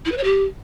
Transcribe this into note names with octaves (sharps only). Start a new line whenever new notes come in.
E4
B4
C#5
G4